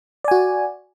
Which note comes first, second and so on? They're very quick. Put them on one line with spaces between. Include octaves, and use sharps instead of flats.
D5 G#5 F#4